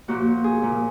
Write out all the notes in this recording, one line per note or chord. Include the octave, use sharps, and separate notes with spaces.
A#2 F3 A#3 F#4
G#4
A#2 F3 A#3